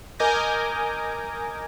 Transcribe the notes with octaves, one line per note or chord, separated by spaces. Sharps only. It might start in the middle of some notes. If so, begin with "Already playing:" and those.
A#4 D#5 G#5 D6 G6 A#6